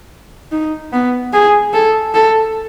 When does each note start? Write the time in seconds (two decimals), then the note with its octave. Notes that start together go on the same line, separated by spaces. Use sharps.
0.52 D#4
0.92 B3
1.33 G#4
1.73 A4
2.14 A4